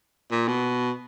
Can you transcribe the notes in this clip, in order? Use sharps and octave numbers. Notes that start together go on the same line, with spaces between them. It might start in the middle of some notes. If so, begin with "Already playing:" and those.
A#2
B2